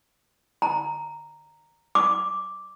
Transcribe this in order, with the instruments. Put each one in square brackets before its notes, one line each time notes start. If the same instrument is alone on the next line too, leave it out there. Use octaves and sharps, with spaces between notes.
[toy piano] A#5
D6